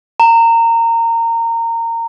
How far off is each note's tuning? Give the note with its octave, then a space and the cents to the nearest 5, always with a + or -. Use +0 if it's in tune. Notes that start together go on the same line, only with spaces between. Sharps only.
A#5 -20